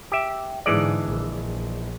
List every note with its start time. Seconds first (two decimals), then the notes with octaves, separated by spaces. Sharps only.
0.12 G4 E5
0.66 G#2 D3 E3 G#3 D5
1.07 A#1